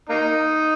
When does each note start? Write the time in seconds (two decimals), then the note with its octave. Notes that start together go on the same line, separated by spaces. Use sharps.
0.09 A#3 D#4